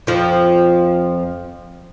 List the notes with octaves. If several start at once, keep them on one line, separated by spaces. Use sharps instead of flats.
F2 F3